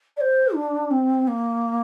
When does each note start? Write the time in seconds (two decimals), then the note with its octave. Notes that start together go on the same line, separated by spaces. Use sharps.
0.17 D5
0.21 C5
0.54 D4
0.91 C4
1.28 A#3